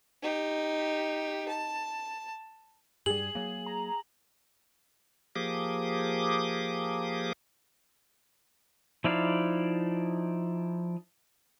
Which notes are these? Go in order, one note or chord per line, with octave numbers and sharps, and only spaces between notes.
D#4 G4
A5
G2 G3 G#4 F#7
F#3 A#3
A#5
F3 A#3 G4 G#4 D6 D#6
F3 D#4 E4 D5 F5